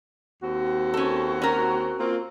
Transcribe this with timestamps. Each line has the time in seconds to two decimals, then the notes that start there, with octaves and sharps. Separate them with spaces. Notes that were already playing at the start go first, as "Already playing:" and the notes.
0.43 D#2 C4 F#4
0.94 C#4 A4
1.42 C#4 A#4
1.99 A#3 C4 F4